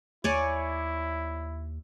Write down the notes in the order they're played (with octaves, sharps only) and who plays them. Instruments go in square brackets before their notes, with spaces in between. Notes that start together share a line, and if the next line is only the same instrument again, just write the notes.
[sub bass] D#2 [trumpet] E4 [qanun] C#5 D5 G#5